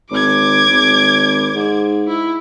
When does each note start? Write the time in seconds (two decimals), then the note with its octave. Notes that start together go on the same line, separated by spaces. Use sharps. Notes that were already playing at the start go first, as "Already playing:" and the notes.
0.11 G#1 D6 G#6
0.70 G#1
1.55 G#2
2.08 E4